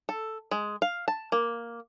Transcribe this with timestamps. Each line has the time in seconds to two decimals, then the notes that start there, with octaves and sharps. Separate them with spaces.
0.09 A4
0.51 G#3
0.82 F5
1.08 A5
1.32 A#3